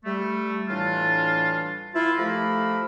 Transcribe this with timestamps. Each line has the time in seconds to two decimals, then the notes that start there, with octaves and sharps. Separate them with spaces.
0.05 G3 A3
0.69 A2 E3 G3 D4 F4
1.95 E4 F4
2.17 F3 A3 G4 A4 A#4 B5